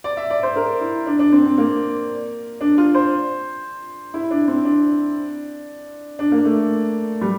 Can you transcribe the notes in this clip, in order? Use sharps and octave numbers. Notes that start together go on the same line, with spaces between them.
D5
E5
D5
C5
A#4
E4
D4
D4
C4
C4
A#3
D4
F4
C5
E4
D4
C4
D4
D4
A#3
A3
G3